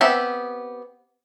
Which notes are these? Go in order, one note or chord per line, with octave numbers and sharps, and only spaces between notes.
B3 C4 G4 E5 F#5